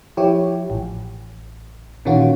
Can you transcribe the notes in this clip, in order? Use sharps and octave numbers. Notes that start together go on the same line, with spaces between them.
F3 E4 G4 C#5
A1
A#2 D#3 E3 C#4 F4 F#4